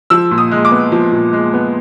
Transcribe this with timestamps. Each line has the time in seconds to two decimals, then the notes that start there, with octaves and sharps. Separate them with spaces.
0.10 F3 E6
0.31 A#2
0.38 D#6
0.51 G#3
0.65 D6
0.72 B3
0.92 F3
1.12 A#2
1.33 G#3
1.54 B3